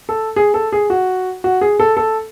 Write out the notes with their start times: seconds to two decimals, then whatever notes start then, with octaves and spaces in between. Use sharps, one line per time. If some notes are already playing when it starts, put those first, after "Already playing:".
0.09 A4
0.36 G#4
0.54 A4
0.72 G#4
0.90 F#4
1.44 F#4
1.61 G#4
1.80 A4
1.97 A4